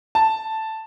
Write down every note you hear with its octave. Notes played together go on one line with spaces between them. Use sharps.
A5